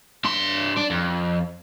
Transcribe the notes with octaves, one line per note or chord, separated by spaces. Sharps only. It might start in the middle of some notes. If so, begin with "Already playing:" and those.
G2 C6
D4 D5
F2